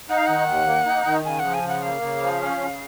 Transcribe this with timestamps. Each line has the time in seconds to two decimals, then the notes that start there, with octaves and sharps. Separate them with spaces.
0.09 D#4 F#5
0.17 F5
0.27 D#3 F#5
0.48 D#2
0.67 A#3
0.86 D#4
1.06 D#3
1.25 C#3 G#5
1.39 F#5
1.45 F3
1.54 G#5
1.63 C#3
1.68 F#5
1.82 A#3 F5
2.01 C#3
2.21 F3
2.40 C#4
2.60 C#3